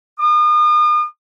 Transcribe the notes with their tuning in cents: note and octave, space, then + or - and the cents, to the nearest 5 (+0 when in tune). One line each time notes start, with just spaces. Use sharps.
D#6 -40